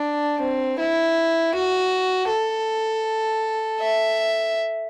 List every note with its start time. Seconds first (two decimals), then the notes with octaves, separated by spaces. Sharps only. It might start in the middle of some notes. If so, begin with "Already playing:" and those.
Already playing: D4
0.41 C4
0.79 E4
1.55 F#4
2.29 A4
3.81 E5